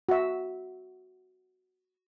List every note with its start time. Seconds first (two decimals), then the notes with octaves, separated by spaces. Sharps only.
0.09 F#4 E5